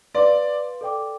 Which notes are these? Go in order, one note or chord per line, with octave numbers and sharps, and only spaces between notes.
B4 D5 F5 C6
A4 D5 G5 D6